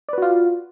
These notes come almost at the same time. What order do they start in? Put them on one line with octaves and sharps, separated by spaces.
D5 B4 F#4 F4